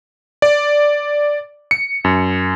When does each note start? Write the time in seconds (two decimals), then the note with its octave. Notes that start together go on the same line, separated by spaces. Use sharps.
0.42 D5
1.71 C#7
2.05 F#2